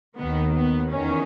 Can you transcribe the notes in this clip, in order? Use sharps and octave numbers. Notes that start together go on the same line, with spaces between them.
D#2 D#3 B3
B3
E2 D#3 C#4